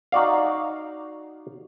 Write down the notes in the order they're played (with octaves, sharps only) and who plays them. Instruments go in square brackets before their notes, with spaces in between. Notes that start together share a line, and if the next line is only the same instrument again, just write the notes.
[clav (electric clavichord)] D#4 F#4 D5 F5